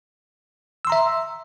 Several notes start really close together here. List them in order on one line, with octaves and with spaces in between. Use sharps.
E6 C6 A#5 E5